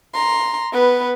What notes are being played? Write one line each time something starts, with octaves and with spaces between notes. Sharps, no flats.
A#5 C6
B3 B4